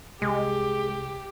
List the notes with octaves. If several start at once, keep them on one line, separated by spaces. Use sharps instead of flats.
C2 G#3 G4